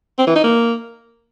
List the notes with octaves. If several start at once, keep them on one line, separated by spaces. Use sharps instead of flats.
C4
E3
D#4
A#3